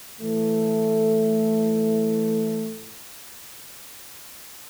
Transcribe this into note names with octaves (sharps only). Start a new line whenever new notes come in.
A2 E3 A3